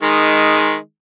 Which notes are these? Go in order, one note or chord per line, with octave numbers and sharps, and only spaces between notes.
D#3 G#3